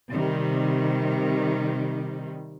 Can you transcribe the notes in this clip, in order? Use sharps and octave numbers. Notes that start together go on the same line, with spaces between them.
C3 D#3 G3